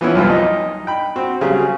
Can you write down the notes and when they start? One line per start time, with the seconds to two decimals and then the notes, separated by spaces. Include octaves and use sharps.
0.01 E3 F3 B3 C#4 E4 C#5
0.15 C2 F#2 F4 A5
0.29 D#4 D#5
0.87 G5 B5
1.16 C4 F#4
1.41 C#3 F#3 G3 G#4